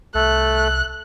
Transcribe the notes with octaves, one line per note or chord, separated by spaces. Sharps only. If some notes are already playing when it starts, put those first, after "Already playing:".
C2 A3 A4 F#6